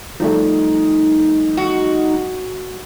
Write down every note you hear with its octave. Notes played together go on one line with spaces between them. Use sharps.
F3 G3 A3 D#4
F#4